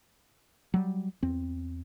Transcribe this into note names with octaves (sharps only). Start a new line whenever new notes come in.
F#3 G3
E2 C4